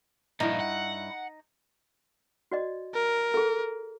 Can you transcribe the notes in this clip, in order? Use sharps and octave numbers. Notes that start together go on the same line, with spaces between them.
G2 A#2 F3 D#4 E4
F#5
F#4 D5 D#5
A#4
G#4 A4